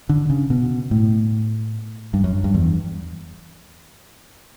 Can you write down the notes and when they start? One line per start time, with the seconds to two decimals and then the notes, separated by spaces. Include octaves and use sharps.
0.09 D3
0.30 C#3
0.50 B2
0.91 A2
2.14 G2
2.24 F#2
2.44 G2
2.54 E2